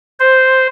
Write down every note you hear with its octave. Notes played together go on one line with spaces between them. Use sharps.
C5